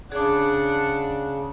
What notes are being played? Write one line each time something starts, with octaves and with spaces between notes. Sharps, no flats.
C#3 D4 G#4 F#5 D6